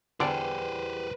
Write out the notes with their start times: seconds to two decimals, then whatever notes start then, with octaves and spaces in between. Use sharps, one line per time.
0.20 E2 D3 G3 B4 C5 D5